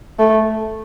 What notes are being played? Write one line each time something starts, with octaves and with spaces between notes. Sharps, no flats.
A3